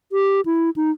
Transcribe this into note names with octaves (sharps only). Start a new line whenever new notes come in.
G4
E4
D#4